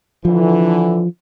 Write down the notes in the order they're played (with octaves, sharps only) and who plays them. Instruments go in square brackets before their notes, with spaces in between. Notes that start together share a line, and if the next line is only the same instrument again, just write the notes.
[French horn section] D3 E3 [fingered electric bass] F3